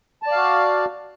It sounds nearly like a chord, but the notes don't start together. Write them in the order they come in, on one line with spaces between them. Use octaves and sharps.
A5 D5 F5 F#4